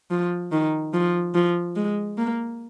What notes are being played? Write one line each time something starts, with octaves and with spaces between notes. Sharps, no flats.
F3
D#3
F3
F3
G#3
A#3